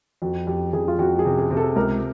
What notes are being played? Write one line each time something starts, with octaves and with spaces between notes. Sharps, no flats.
F2 F#4
F2 G4
F2 G#4
F4
F2 F#4
G#4
C3
G#4
C3
A4
C#2 A#4